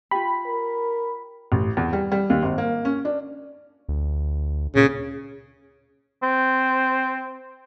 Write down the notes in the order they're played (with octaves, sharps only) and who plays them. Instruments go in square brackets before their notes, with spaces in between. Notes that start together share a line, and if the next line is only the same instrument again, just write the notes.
[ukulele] F4 G4 [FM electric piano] B5
[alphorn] A#4
[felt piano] A1
E2
G3
G3
D#2
G#1
A#3
C#4
D4
[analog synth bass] D2
[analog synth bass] A#2 [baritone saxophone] C#3
[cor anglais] C4